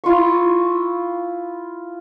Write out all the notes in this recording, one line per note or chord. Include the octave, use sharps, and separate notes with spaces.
E4 F4 C#6